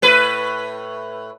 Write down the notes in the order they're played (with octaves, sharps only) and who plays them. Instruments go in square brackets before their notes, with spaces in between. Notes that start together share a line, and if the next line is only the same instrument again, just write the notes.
[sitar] A2 B4